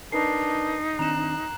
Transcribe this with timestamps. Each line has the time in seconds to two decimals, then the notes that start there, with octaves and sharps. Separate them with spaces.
0.12 D4 D#4 A#4 B4 C7
0.99 D#3 C4 D4 A#5 F#6 E7